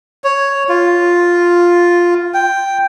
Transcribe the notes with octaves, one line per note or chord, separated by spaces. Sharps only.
C#5
F4
G5